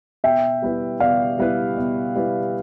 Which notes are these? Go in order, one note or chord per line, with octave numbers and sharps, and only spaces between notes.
B2 E5 G5
G3 B3 E4 B4
B2 D5 F5
G3 B3 E4 B4
B2
G3 B3 E4 B4